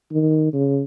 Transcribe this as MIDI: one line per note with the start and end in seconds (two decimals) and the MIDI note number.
0.12 0.51 51
0.53 0.83 49